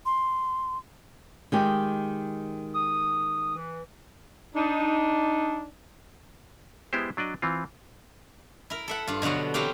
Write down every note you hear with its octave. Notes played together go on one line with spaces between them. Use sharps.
C6
D#3 G#3 G4
D#6
E3
D4 D#4
G#3 B3 E4 G4 C5
F#3 D4 D5 D#5
E3 C4 F4
E4 A#4
A4 E5 F#5
G2 F4
B2 D3 F#3 B3 F#4
E3 F#3 C4 G4 F5 G5